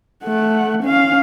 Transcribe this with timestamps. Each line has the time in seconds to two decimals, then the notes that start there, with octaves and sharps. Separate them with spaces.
0.24 A3 F#5
0.82 C#4 F5